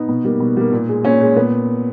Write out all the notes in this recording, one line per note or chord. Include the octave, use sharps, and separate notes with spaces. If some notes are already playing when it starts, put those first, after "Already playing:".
Already playing: B3 D#4
B2
G3 A#3
B2
G3 A#3
A#2
G#3
A#2 C#4
G#3
A#2 B3